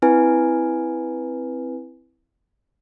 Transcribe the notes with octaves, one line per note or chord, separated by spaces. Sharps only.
C4 E4 B4 G#5